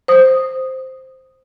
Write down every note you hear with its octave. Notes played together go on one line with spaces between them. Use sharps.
C5 D#6